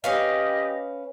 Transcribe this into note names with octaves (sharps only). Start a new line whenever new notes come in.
C#4 G4 B4 D#5 F5